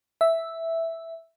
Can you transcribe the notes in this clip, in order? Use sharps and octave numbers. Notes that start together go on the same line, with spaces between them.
E5